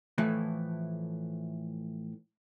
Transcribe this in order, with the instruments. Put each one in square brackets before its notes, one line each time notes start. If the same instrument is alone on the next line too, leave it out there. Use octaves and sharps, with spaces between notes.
[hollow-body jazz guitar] A2 E3 F3 A3